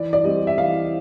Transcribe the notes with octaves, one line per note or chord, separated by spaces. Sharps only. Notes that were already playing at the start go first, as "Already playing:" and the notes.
Already playing: E3 D5
D5
G3 C4 D#5
E5
E3 F5